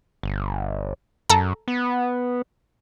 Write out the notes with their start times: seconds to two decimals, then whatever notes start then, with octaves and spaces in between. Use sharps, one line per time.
0.23 G1
1.30 F#2 A4 A#5
1.68 B3